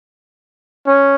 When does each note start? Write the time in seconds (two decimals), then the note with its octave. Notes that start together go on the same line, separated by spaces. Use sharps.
0.87 C#4